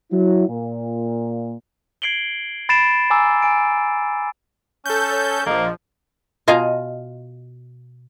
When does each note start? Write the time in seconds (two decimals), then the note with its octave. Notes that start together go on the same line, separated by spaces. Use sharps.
0.11 F#3 E4
0.48 A#2
2.02 G#6 C7 D7 F#7 G7
2.69 B5 A6 C7 D7 E7
3.10 G#5 A#5 D6 E6 E7
3.42 G#5 D7
4.86 C#4 A4 G6
5.10 C#5
5.46 A#1 F3 A#3 D#5
6.48 B2 F4 D#5 F5 G#5 A#5